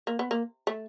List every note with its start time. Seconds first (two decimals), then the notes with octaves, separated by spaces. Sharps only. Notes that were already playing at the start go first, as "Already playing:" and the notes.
0.07 A#3
0.19 B3
0.31 A#3
0.67 A3